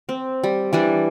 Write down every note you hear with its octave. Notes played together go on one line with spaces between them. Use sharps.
C4
G3
E3 G3 D4